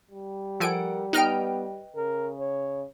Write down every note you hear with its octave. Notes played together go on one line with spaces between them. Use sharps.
G3
F3 A4 A#4 F#5 G#5 D7
B3 D#4 B4 D#5 G5 F6 D7
C#3 A#4
C#5